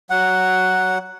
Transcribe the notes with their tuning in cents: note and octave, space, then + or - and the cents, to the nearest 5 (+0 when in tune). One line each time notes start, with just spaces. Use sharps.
F#3 +10 F#5 +0